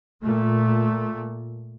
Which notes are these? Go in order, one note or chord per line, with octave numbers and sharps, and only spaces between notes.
A#2 A3